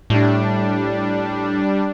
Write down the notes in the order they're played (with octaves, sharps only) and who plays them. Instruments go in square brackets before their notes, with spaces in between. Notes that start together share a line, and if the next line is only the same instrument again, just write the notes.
[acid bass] A2 [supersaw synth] G3 D4